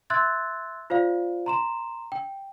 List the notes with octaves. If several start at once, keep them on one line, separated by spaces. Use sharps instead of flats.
E5 C6 E6 F#6 G#6 A6
F4 C5 D5 F5
A#5 C6 E7
G5